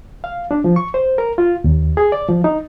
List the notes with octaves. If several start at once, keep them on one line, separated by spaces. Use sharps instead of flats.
F5
D4
F3
C#6
C5
A#4
F4
D#2
G#4
D5
F3
D#4